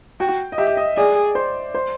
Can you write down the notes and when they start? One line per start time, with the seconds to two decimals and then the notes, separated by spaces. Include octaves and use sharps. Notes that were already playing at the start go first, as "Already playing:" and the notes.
0.20 F#4 G5
0.52 D#5
0.58 G4 E5
0.77 D#5
0.97 G#4 D5
1.35 C5
1.75 C5